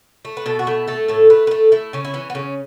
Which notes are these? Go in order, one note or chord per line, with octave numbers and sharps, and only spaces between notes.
A3
B4
B2 A4
F#4
A3 E4
A3 A4
A2 A4
A3 B4
B4
A3 A4
A3 E4
C#3 C#4
E4
E3 C#4
B3
C#3 C#4